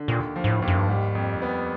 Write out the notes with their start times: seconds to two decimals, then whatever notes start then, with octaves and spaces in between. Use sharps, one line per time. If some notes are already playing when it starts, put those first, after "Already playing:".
Already playing: D3
0.08 D#2 A#2
0.36 F3
0.44 G#2
0.49 A2
0.62 D#2
0.68 F#2
0.78 G2
0.88 G#2 G3
1.15 F2
1.42 B3